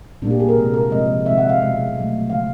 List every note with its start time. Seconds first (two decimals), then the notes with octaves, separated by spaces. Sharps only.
0.22 A#2 G3 A#3 D4
0.31 G4
0.40 G#4
0.49 A#4
0.57 C3 E3 G#3
0.74 A#4
0.91 C3 F3 G#3 D#5
1.25 C3 D#3 G#3 E5
1.38 F#5
1.49 F5
1.61 B2 G#3
1.96 B2 F#3 A3
2.30 C#3 F3 G#3 F5